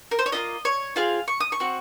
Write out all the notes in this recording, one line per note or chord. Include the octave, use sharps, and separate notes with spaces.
A#4
C5
C#5
A#3 C#4 F4 D#5
C#5
C4 F4 G#4 F5
C#6
D#6
C#6
C4 F#4